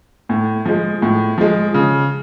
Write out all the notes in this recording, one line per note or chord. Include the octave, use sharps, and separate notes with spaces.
A2
F3 G#3
A2
F3 G#3
C#3